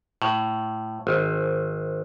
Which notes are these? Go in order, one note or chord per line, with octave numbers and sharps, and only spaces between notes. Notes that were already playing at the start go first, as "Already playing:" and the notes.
A2
G#1